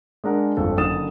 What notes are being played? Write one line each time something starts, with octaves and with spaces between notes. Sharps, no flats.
G#3 D4 A#4 F#5
G1 F2 A4
F#1 D3 D#6 A6 E7